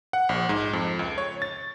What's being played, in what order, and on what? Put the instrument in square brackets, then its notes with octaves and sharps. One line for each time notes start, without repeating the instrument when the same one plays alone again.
[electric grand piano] F#5
A#1
G#2
F2
C#2
C#5
A6